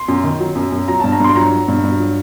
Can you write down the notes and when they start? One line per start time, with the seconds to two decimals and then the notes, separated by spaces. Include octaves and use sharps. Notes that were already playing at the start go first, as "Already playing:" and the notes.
Already playing: C6
0.08 F#2
0.24 D#3
0.40 F#3
0.55 F#2
0.72 F#2
0.88 F#3 A#5
1.00 A5
1.04 G2
1.12 A#5
1.20 G2 C6
1.35 F#3 A#5
1.51 F#3
1.68 G2
1.83 G2
1.99 F#3